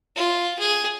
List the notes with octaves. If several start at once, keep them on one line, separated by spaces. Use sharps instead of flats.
F4
G#4